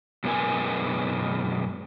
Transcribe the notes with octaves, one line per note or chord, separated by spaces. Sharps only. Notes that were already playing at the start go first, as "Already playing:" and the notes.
F#2 B2 G#3 B3 A#4 G#5